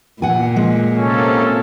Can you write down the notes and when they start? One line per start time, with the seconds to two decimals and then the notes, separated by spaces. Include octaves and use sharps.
0.22 A#2 F#5 G#5
0.56 G#3
0.98 C3 A#3 C#4 A4